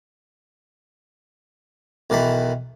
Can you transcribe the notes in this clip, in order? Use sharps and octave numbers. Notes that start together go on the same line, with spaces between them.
B1 D#3 E3 A5 B5